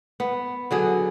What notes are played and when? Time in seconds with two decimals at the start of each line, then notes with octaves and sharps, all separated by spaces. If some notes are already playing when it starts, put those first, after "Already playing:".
0.20 B3
0.71 D3 F#3 G#4